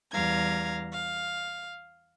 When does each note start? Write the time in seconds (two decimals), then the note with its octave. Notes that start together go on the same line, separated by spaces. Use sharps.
0.12 E2 G3 F5 A#5 G#6
0.93 F5